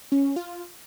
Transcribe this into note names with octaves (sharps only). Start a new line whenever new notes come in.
C#4
F4